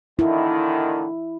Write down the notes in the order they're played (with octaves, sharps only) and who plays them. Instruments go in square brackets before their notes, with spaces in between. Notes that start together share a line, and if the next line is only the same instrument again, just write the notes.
[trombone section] A#2 D3 D#3 [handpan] E4